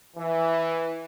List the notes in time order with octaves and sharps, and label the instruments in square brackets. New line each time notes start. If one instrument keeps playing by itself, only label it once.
[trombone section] E3